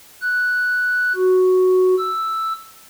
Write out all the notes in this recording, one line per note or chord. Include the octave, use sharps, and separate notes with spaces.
F#6
F#4
E6